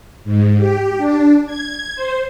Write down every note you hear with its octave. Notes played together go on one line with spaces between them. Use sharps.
G#2
G4
D4
G#6
C5